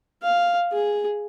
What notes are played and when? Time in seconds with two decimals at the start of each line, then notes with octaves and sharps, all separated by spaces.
0.23 F5
0.72 G#4